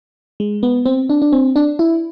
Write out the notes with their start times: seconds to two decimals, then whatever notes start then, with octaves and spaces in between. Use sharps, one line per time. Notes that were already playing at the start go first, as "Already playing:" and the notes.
0.40 G#3
0.63 B3
0.86 C4
1.09 D4
1.22 D4
1.33 C4
1.56 D4
1.79 E4